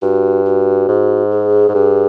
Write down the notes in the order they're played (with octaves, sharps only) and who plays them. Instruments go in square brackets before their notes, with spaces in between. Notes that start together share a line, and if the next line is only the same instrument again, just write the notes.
[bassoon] G2 [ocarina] F#4
[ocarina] F#4
[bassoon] G#2
[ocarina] G#4
[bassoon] G#2
G2